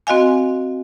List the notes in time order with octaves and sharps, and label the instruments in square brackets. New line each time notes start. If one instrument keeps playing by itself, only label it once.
[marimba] C4 F#4 D#5 F5 G#5